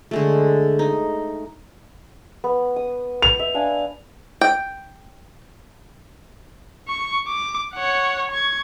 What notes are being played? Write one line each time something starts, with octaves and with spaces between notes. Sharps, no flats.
D3 G#3 A3
D#4
B3
D#6
F7
E5
D4 F5 G#5
G5
C#6
D6
C#5 F#5
C#6 G#6